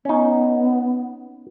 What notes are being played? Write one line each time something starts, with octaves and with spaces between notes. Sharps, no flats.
B3 C#4 D#4